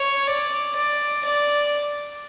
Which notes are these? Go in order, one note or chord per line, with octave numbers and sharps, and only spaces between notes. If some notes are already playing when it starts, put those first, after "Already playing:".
Already playing: C#5
D5
D5
D5